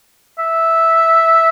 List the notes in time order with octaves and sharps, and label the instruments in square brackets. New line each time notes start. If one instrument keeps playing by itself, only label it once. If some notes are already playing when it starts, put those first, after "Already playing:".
[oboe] E5